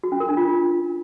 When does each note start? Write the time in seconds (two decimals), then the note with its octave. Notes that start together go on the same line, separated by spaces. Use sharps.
0.04 F#4
0.12 C#4
0.20 A#4
0.29 D4
0.37 F4